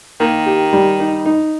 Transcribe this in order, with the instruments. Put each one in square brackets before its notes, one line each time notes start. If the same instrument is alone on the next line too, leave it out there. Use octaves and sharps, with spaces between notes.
[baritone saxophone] D#3 [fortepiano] A#3
[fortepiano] G4
G3
D#4
D#4